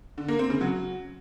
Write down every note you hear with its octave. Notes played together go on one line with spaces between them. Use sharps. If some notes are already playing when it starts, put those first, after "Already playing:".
D3
A#3
C4
C#3
F#3